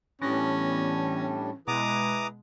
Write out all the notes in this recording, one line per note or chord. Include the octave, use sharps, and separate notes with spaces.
A2 E3 G3 B3 C#4 D4 A#6
B2 G#3 E4 G#4 B4 A#5 D6 D#6